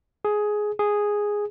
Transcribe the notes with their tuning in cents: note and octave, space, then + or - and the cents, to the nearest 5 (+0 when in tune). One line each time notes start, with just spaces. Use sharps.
G#4 +10
G#4 -5